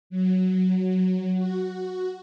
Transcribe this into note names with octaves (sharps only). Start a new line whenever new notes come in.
F#3
F#4